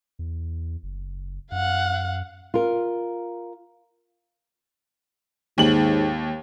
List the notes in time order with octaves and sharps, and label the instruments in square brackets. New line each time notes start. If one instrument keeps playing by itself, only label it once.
[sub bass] E2
F#1
[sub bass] F#2 [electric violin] F5 F#5
[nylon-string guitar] F4 A#4
[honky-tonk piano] D#2 F#7 [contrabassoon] G#2